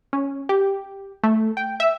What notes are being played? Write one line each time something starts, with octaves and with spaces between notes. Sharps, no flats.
C#4
G4
A3
G5
E5